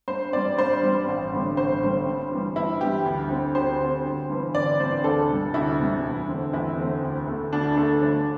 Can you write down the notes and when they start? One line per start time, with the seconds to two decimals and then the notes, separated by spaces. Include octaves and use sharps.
0.08 G2 C5
0.32 G3 C4 D5
0.57 G2 C5
0.83 G3 C4
1.08 A1
1.32 G2 D3 G3 C4
1.57 A1 C5
1.82 G2 D3 G3 C4
2.07 G2
2.32 E3 G3
2.56 G2 E4
2.81 E3 G3 G4
3.06 D2
3.30 D3 C4
3.55 D2 C5
3.80 D3 C4
4.05 G1
4.29 G2 E3 C4
4.55 G1 D5
4.80 G2 E3 C4 C5
5.04 D2 A4
5.29 C3 G3
5.54 D2 E4
5.78 C3 G3
6.04 E2
6.28 D3 A3 C4
6.53 E2 E4
6.78 D3 A3 C4
7.03 D2
7.27 D3 A3
7.53 D2 D4
7.77 D3 A3
8.02 G1